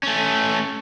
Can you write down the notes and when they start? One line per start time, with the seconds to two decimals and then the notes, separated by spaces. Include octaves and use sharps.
0.03 A3 C#4